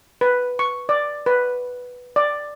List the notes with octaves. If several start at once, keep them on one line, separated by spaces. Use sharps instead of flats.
B4
C#6
D5
B4
D5